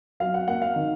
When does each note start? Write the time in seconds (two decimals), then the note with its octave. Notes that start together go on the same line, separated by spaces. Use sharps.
0.20 F#3 F5
0.34 F#5
0.48 A#3 F#5
0.62 F5
0.76 D#3